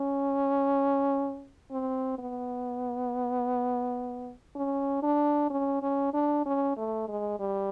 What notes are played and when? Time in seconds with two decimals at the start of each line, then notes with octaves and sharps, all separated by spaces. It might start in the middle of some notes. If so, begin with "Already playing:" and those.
Already playing: C#4
1.71 C4
2.18 B3
4.55 C#4
5.03 D4
5.50 C#4
5.82 C#4
6.14 D4
6.45 C#4
6.77 A3
7.08 G#3
7.40 G3